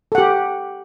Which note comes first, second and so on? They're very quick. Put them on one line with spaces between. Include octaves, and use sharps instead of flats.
A4 F#5 G4